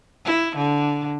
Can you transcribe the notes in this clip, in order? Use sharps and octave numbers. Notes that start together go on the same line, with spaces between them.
E4
D3